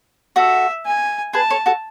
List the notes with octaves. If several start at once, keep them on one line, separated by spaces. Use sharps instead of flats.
F#4 A4 E5
G#5
G#4 B4 A5
A4 C#5
F#4 A4